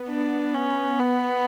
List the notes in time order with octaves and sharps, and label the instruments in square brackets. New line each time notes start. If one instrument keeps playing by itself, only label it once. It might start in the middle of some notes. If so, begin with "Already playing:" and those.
Already playing: [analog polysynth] B3
[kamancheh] D4
C#4
B3